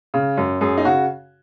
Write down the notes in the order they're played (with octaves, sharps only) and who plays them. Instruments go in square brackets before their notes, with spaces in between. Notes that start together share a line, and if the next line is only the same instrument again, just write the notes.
[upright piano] C#3
F#2
F#2 G#4
D#4
C#3 F#4